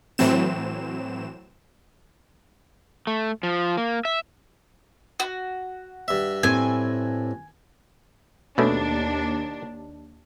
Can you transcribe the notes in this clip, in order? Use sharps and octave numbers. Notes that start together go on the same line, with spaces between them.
A2 E3 F#3 C4 E7
A3
F3
A#3
E5
F#4
G2 E5
A2 C4 G#5
D#2 B2 A3 C#4 D4